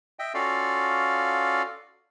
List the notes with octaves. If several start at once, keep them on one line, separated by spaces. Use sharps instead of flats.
D#5 E5 G5
C#4 F4 F#4 A4 D5 F5